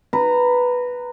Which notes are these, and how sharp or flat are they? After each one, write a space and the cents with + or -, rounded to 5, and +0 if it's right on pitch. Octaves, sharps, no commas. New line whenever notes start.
B4 +0 A#5 -15